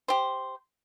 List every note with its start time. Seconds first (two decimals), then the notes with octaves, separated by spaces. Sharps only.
0.08 G4 C5